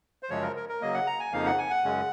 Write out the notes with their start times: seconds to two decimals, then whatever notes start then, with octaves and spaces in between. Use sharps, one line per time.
0.23 C5
0.30 F#2 C#3 F3 G#3 C#5
0.42 A#4
0.56 A#4
0.69 A#4
0.81 C#3 F#3 A#3 D#5
0.94 F#5
1.07 A#5
1.20 G#5
1.32 F2 C#3 F3 A#3 D#4 F5
1.46 F#5
1.58 G#5
1.70 F#5
1.84 F#2 C#3 G#3 C#4